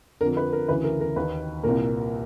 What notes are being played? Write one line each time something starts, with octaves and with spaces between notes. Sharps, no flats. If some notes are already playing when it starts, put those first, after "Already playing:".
F2 D3 A#4
B4
A#4
D2 C#3 E3 B4
A#4
A#4
D#2 D#3 B4
C2 A#2 A#4